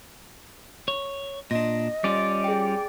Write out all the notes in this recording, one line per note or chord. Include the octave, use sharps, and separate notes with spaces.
C#5
A#2 D4 D#5 A#6
G3 C#4 F4 D5
G#4 G5